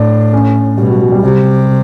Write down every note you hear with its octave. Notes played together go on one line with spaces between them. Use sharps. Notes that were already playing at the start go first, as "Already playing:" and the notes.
Already playing: A2 D4
C#4
B2 G3
F#3
F#3
G3
C3 G3